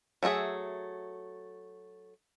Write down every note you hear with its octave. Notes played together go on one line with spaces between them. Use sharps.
F#3 A3 F#4 G#4 E5